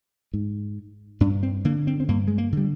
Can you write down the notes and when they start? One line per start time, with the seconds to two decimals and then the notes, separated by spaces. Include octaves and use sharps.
0.34 G#2
1.21 G2 D4
1.43 C4
1.65 D3 A#3
1.87 C4
2.00 C4
2.09 G2 A#3
2.28 G#3
2.38 A#3
2.52 D3 G3